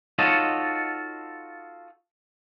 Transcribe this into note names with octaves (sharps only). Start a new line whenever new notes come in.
D#4 F4 F#4 A4 C#5 D#5